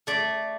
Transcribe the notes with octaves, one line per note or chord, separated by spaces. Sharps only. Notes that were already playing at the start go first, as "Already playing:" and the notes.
A3 D5